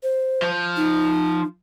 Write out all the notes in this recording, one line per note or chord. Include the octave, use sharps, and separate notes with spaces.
C5
F3
D#4